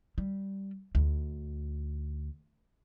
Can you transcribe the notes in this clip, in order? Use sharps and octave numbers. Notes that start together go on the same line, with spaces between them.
G3
D2